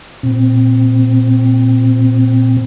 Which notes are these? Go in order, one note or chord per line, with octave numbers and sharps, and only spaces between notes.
A#2 C4